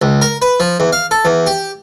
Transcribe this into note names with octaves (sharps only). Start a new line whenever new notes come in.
C#2
A#4
B4
F3
E2
F5
A4
E2
G4